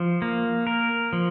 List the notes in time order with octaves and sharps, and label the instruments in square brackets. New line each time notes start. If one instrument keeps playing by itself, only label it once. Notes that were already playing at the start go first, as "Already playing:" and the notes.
Already playing: [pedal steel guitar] F3
A#3
A#4
F3